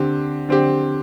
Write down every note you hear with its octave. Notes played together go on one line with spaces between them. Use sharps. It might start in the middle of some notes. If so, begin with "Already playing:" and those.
Already playing: D3 C4 G4
D3 C4 G4